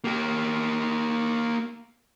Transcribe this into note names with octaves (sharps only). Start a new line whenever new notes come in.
A#3 G4